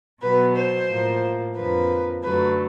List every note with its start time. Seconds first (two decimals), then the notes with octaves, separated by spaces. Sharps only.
0.21 B2 F#3 B3 B4
0.55 C5
0.88 A2 F3 A#3
1.55 F2 D3 F3 A#3 B4
2.23 F#2 D3 F#3 A3 B4